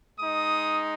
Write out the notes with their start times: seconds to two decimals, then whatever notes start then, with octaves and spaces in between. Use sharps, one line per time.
0.19 G#3 D#4 D#6